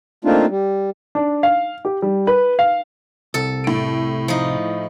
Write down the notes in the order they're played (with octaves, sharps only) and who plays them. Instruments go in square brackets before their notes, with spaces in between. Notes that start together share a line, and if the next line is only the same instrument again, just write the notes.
[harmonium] A3 A#3 C4 D4 D#4 F4
G3
[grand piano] D4
F5
G4
G3
B4
F5
[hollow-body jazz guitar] C2 [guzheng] A4
[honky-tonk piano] A2 D7
[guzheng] F3 D#4